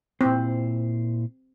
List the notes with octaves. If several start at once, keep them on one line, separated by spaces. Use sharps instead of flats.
A#2 C4 E4 C5